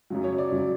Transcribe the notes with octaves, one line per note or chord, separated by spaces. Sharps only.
F#2 C#3 F#3
C#5
D5
C#3 F#3